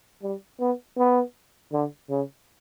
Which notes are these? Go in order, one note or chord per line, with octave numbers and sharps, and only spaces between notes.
G3
B3
B3
D3
C#3